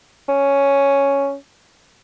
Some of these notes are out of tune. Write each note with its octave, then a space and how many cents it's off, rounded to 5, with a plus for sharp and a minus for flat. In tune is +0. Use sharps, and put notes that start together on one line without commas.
C#4 +5